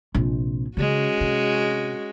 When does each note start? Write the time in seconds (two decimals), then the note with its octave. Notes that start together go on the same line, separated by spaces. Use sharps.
0.14 A#1 C3
0.77 C#3 G#3 C#4 F#4
1.21 C3